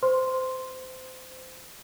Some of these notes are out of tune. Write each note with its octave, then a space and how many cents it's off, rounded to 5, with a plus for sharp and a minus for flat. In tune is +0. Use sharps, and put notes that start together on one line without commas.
C5 -25 C6 +0